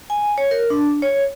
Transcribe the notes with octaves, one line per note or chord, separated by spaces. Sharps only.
G#5
C#5
A#4
D4
C#5